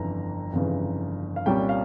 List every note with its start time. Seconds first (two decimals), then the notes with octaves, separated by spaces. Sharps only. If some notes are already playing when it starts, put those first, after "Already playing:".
Already playing: G1 F2 C#3 E3 A#5
0.53 G1 F2 C#3 E3
1.36 F5
1.46 C2 A#2 G3 C#4 G5
1.69 F5